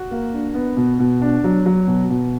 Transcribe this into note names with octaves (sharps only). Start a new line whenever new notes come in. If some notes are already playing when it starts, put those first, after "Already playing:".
Already playing: F#4
A#3
D4
B3
B2
B2
D4
F#3
F#3
B2
B2